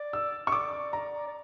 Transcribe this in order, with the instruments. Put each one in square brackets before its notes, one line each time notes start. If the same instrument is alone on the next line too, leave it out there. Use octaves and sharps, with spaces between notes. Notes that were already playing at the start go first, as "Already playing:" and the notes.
Already playing: [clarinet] D5
[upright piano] E6
C#6
[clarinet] D5 [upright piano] D6
[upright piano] A#5
[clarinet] D5